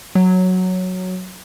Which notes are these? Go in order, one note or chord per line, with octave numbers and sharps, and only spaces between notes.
F#3